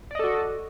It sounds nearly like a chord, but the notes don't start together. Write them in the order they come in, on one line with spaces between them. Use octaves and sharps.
D5 D#5 A4 F#4